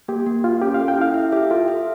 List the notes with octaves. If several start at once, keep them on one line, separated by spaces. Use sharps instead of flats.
A#3 G4
A#3
A#3 F4
C#4 G4
F5
A4
G5
E4 F5
E5
G4 E5
F4 A4
E5